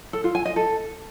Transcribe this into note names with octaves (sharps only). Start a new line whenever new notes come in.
A4
F4
G#5
D#5
A4